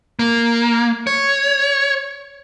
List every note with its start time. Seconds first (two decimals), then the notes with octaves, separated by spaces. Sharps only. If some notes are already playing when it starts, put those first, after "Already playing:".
0.19 A#3
1.07 C#5